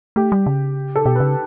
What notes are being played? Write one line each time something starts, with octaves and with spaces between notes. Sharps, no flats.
A3 G4
G3
C#3
A4
B2 G4
B4
C#3